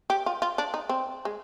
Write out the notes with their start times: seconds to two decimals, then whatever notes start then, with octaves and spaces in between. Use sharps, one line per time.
0.10 G4
0.26 F4
0.42 F4
0.58 D4
0.74 D#4
0.89 C4
1.25 G#3